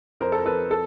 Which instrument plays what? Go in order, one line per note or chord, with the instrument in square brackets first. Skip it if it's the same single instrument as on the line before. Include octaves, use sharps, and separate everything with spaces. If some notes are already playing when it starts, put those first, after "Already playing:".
[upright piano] F2 A#4 C5
A4
A#4
F2 A4 B4
A4